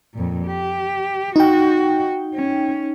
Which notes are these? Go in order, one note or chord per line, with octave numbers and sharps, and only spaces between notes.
F2 A#2
G4
D#4 F#4 G5
C#4